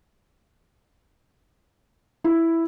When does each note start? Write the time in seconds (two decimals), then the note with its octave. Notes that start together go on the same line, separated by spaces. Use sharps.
2.24 E4